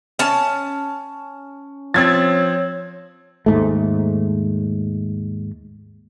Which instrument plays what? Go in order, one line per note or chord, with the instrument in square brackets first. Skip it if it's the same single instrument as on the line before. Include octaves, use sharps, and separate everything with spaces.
[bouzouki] C#4 A5
[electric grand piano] F3 C4 [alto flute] C#5 [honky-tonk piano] E6 G#6 A6
[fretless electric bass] D#2 G#2 A3